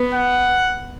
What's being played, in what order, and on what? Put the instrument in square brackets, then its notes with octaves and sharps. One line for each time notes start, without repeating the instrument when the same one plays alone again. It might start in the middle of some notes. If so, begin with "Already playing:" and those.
Already playing: [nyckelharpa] B3
[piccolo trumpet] F#5